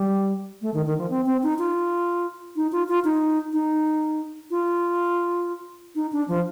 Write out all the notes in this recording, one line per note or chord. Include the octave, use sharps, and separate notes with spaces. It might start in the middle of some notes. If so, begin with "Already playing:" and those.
Already playing: G3
A3
D#3
D#3
F3
C4
C4
D#4
F4
D#4
F4
F4
D#4
D#4
F4
D#4
D4
F3